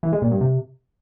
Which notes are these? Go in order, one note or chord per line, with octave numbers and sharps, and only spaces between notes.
E3
G#3
A#2
G2
C3